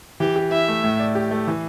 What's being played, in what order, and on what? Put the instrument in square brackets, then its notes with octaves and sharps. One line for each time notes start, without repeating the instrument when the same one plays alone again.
[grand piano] E3 [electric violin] G4
[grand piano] G4
[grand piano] E4 [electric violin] E5
[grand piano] A3
A2
D5
G4
A3
E3